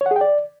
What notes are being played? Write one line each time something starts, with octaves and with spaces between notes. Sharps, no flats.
C#5
F#5
G#4
G5
D5